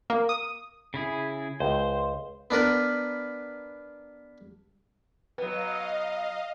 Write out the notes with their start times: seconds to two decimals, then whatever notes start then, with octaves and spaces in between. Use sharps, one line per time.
0.10 A#3
0.29 D#6
0.94 C#3 E4 G#4
1.60 C#2 C5
2.50 B3 D4 A#4 B4
5.38 F#3 B3 B4 D#5 F5